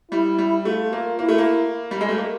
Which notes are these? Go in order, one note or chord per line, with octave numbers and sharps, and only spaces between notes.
G3 E4
G3
A3 F4
A#3
A#3 E4
A3
A#3
G3
G#3
A3
A#3